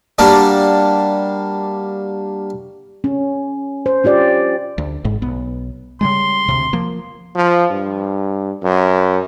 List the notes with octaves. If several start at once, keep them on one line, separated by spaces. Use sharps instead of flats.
G3 A#3 D4 F#4 D5
C#4
C5
C#4 F4 G4 D5
D2
G#1 G#2 G#3
B1 B3
C#3 G3 G#3 C6
D2 C3
F3 A#3
F3
G2
F#2